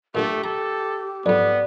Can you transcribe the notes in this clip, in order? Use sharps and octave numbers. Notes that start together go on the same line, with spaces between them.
A#2 D3 A3 G4
A4 A#5
F2 G#2 B3 D5